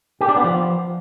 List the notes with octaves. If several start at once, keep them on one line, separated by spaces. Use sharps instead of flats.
G4
D4
B3
F3